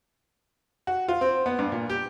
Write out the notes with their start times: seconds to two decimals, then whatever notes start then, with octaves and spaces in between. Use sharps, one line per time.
0.87 F#4
1.08 F4
1.21 C4
1.46 B3
1.59 G2
1.72 A#2
1.89 G4